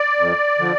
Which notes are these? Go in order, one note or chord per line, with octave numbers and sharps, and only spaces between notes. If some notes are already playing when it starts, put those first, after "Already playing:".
Already playing: D5
F2
D3 F3